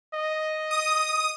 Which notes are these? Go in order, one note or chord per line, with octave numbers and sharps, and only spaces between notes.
D#5
D#6